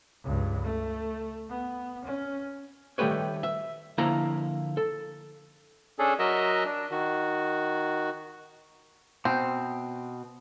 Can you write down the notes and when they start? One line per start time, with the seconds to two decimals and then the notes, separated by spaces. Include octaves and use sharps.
0.24 C#2 G2
0.64 A3
1.50 B3
2.05 C#4
2.98 D#3 G3 A3 G4 B4 C#5
3.43 E5
3.98 D3 F3 A#3 E4 A#5
4.77 A4
5.99 C#4 D4 G#4 A4
6.19 F#3 F#4 A#4 D#5 E5
6.65 D4
6.91 D#3 F#4
9.25 B2 C4